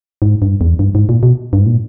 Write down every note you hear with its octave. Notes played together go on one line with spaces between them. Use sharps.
G#2
G2
E2
G2
G#2
A#2
B2
G2
G#2
A#2